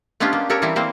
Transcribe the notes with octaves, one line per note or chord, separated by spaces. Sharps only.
G#3 B3 C#4 D4 F4 G4
A#3
G4 A4 A#4 C#5
E3 G3 C4 E4
G3 A#3 C4 C5